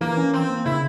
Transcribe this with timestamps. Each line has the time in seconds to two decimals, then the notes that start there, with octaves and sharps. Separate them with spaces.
0.01 E3 A#3
0.17 C#4
0.33 E3 C4
0.49 A#3
0.66 C#3 E4